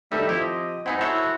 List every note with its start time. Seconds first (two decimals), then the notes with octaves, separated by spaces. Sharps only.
0.12 D#3 G3 A3 D#4 A4 E5
0.29 F3 C4 E4 G4
0.41 D#5
0.86 B3 C4 D#4 E4 F#5 G#5
1.01 E4 F#4 A4 C5 C#5